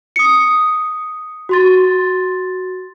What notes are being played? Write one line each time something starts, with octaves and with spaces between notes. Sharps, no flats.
D#6 C#7
F#4 C6 A6